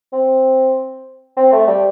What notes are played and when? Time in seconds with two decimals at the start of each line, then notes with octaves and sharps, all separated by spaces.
0.13 C4
1.37 C4
1.52 A3
1.68 G3